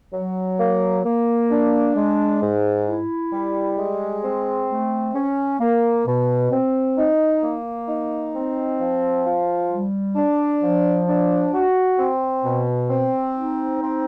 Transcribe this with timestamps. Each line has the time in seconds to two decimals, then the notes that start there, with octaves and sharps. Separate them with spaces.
0.13 F#3
0.59 A#3
1.04 A#3
1.50 D4
1.95 G#3
2.41 G#2
2.87 E4
3.32 G3
3.77 G#3
4.24 C4
4.69 A3
5.14 C#4
5.60 A#3
6.06 B2
6.51 C4
6.97 D#4
7.43 A#3
7.88 D#4
8.34 C4
8.80 F3
9.25 F4
9.71 G3
10.16 D4
10.62 F3
11.07 D4
11.53 F#4
11.98 C4
12.44 B2
12.90 C4
13.36 D#4
13.81 C4